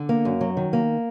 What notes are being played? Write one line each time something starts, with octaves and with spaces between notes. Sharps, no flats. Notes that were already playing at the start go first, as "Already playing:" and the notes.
Already playing: D3
A#3
F#2
F#3
D#3
A#3